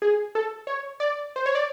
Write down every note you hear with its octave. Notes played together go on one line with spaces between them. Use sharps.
G#4
A4
C#5
D5
C5
C#5
D5